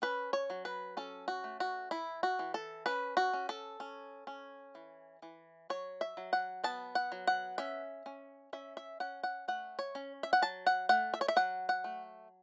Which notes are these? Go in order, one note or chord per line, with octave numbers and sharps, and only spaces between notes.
C#4 B4
C#5
F#3
B4
C#4 A4
F#4
A3
F#4
E3 E4
F#4
E3
A4
C#4 B4
F#4
C#4
A4
C#4
C#4
E3
E3
F#3 C#5
E5
F#3
F#5
B3 A5
F#5
F#3
F#5
C#4 E5
C#4
C#4 E5
E5
C#4 F#5
F#5
A3 F#5
C#5
C#4
E5
F#5
F#3 A5
F#5
A3 F#5
E5
C#5
E5
F#3 F#5
F#5
A3